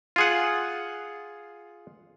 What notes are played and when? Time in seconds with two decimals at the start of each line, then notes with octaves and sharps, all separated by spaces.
0.16 F4 G#4 F#5